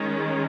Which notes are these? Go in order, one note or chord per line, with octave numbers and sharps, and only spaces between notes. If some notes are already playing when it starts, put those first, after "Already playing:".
Already playing: D#3 G#3 C#4